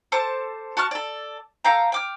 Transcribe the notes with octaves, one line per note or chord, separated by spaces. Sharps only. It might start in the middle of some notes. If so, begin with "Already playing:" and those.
A4 C5 A5 D6
F#4 A5 C#6 F6
A4 D5
A4 F5 G5 A#5
G5 D6 F6